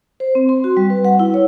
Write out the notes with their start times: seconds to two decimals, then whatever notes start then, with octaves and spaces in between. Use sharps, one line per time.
0.20 C5
0.35 C4
0.49 C6
0.64 F#4
0.77 G3
0.90 B4
1.05 F#5
1.19 E4
1.34 C#5